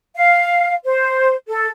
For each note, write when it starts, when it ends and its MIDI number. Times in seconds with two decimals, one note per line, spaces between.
0.16 0.74 77
0.85 1.34 72
1.48 1.69 69